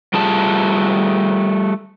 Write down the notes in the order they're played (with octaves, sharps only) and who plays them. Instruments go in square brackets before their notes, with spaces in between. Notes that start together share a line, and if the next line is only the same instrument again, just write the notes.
[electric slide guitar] G3 A3 F4 G#4 A5